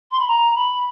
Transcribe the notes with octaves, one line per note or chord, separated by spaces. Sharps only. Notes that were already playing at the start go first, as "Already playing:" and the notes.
C6
B5
A#5
B5